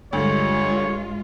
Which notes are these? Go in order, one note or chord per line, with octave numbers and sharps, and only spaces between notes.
D2 G2 G#3 F4 C#5